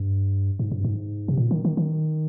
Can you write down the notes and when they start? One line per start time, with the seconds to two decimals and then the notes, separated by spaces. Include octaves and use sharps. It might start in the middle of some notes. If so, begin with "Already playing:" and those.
Already playing: G2
0.59 G#2
0.72 G2
0.85 G#2
1.28 C3
1.37 A#2
1.51 D#3
1.65 D#3
1.77 D#3